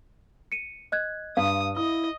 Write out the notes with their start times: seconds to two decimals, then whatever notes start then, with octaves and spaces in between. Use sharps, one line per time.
0.52 C#7 D#7
0.92 D#5 F#6 G#6
1.37 G2 F5 D#6
1.76 E4 D#5 D#6